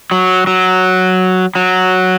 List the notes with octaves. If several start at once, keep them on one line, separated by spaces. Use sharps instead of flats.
F#3
F#3
F#3